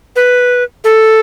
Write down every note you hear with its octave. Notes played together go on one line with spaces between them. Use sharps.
B4
A4